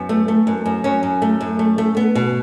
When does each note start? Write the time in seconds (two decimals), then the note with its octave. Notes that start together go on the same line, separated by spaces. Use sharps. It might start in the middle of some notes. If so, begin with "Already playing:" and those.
Already playing: F#2 B3
0.09 A3
0.28 A3
0.47 F#2
0.65 F#2
0.84 F#2 C#4
1.03 F#2
1.22 A3
1.40 F#2
1.59 A3
1.78 A3
1.97 B3
2.15 B2